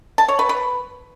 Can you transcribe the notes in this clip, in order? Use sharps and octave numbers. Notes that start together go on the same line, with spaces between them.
A5
C#5
B4
B4